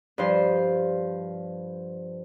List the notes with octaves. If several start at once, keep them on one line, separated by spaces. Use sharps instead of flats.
G2 F3 C5